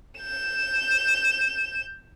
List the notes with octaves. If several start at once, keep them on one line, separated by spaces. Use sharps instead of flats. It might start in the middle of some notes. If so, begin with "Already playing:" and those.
G6 E7